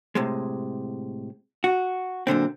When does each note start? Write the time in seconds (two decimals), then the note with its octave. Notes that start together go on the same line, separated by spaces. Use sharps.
0.15 A2 C3 G#3
1.64 F#4
2.27 F#2 A#2 D3 C4